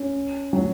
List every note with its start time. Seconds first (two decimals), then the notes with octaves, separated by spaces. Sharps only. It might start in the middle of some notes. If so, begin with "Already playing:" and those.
Already playing: C#4
0.53 F#3